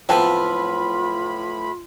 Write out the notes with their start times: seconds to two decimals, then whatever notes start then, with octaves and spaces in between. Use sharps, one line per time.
0.09 A2 F3 F#3 B3 C4 F4 A4 B5